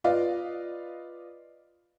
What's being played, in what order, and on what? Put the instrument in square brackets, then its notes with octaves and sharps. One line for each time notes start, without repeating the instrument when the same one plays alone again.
[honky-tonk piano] F4 B4 D5 D#5 F5